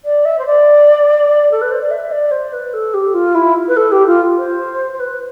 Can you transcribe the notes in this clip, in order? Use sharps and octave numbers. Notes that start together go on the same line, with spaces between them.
D5
E5
C5
D5
A4
B4
C5
D5
E5
D5
C5
B4
A4
G4
F4
E4
B4
A4
G4
F4
C5
C5
B4